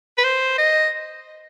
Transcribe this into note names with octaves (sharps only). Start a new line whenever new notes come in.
B4
C5
D#5